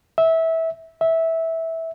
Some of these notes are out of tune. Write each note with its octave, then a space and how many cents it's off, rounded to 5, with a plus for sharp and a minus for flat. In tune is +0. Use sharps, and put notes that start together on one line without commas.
E5 -20
E5 -15